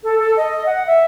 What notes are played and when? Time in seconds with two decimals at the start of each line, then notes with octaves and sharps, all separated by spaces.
0.03 A4
0.19 A4
0.37 D#5
0.66 F#5
0.86 E5